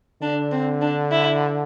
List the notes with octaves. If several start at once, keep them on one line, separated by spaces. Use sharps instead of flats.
D3 D4
C4
D4
E4